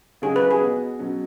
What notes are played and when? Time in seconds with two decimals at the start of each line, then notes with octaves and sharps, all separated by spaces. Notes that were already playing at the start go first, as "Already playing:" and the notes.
0.22 C#3 F#3 C#4 F#4 G#4
0.36 B4
0.51 G#4
0.60 B2 B3 F#4
0.99 B2 F#3 C#4